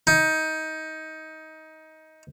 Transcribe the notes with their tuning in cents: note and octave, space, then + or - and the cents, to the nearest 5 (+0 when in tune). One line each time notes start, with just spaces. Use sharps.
D#4 +20